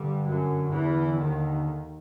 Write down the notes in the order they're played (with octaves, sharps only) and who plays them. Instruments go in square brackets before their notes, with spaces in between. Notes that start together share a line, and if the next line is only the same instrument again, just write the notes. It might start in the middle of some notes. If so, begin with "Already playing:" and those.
Already playing: [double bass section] G2 G3 [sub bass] D3
[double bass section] F#2 F#3
E2 E3
D#2 D#3